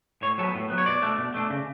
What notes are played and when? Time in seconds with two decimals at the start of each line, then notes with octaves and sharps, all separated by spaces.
0.22 A2 C#5
0.38 F#3 A4
0.43 B3
0.55 A2
0.70 F#3 B3
0.78 C#5
0.86 B2 D5
1.02 A3 D4
1.18 B2
1.34 A3 D4
1.50 C#3